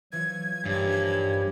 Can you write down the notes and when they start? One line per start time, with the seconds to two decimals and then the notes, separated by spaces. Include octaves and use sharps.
0.12 E3 F#3 F4 C#5 G#6
0.65 A#1 G2 D#4 G4 C#5 G#5